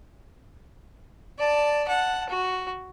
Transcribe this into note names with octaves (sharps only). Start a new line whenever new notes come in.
D5 A5
F#5 A5
F#4